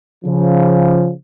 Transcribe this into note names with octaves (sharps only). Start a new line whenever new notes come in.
C#3 F3